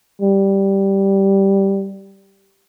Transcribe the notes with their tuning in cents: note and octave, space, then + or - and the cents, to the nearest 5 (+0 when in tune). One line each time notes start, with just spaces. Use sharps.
G3 -5